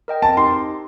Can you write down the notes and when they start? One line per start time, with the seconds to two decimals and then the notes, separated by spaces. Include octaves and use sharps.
0.08 A#4 D#5 G5
0.22 C4 A5
0.37 D#4 G4 C6